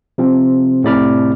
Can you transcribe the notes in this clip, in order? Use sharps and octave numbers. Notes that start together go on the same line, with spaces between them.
C3 F3 C4
A2 C3 D5 B5 F6